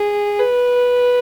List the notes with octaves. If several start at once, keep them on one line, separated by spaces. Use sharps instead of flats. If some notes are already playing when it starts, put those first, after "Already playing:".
Already playing: G#4
B4